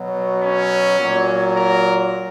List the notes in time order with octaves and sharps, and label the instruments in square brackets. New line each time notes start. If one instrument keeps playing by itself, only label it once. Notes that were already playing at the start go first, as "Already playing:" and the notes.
Already playing: [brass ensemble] B2 F#3
C#4
A#2 F#3
A#4